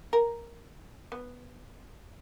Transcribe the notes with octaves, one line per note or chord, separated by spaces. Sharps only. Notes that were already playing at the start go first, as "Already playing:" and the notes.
A#4
B3